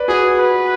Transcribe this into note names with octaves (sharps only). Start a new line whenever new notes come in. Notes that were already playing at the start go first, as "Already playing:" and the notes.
Already playing: B4 D5
F#4 G#4
B4